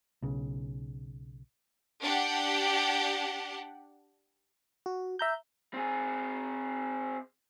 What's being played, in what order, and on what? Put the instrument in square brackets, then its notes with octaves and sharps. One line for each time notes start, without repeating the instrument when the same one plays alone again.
[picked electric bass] B1 C#3
[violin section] D4 G4 F#5
[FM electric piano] F#4
E5 A#5 G6
[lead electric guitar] C4 G#4